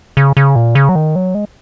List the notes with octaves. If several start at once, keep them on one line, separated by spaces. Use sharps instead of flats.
C#3
C#3
A#2
C#3
F#3
D#3
F#3
G#3